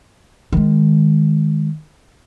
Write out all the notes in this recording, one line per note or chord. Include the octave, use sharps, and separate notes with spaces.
D#3 G#3